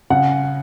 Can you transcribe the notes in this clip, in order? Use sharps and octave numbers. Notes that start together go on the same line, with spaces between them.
C#3 F#5